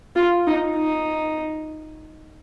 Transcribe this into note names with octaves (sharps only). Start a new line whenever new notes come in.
F4
D#4
D#4